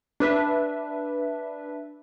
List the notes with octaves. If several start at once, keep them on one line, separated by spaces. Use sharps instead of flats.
D4 B4 E5